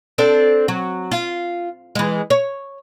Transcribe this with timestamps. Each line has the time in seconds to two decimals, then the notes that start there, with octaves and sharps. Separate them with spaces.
0.18 C4 D4 A4
0.68 F#3
1.11 F4
1.95 E3 G#3
2.30 C#5